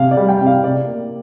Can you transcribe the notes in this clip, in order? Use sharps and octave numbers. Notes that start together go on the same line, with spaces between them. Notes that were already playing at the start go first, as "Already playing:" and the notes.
Already playing: C3 F5
D5
G3
G5
C3
F5
C3 D5
A#3